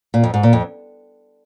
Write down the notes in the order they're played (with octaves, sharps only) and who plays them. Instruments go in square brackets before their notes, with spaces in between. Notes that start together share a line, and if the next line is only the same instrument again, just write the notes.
[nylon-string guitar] A#2
F2
G#2
A#2
F2